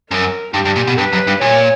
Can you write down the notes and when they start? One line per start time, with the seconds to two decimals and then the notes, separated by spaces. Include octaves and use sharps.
0.11 F#2 A#4
0.54 G2 G4
0.65 G2
0.76 A#2
0.87 B2
0.97 G2 B4
1.13 F#2
1.27 G2
1.41 A#2 C#5